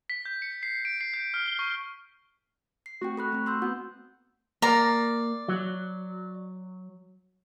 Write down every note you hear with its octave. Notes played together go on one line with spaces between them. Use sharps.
B6
G6
C#7
C7
D7
C7
G6
F6
G7
C#6
C7
A3 C4 F#4 G5
A4 B5 F#6
A3 C4
C6 E6 G6
B3 G6
A#3 D5 A#5
F#3